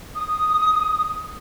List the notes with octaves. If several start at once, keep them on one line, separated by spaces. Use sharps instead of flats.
D#6